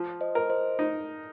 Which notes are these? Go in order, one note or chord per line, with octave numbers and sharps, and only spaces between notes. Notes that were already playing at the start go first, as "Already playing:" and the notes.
Already playing: F3
C5 D#5
A#4
C5 D#5
D#4